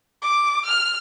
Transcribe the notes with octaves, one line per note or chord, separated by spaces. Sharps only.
D6
F6